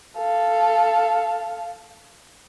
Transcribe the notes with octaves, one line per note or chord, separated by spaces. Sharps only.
A4 F5